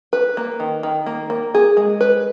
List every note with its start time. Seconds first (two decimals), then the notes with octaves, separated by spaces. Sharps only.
0.13 B4
0.37 A#3
0.60 D#3
0.83 D#3
1.06 A#3
1.30 A#3
1.54 G#4
1.77 G#3
2.01 B4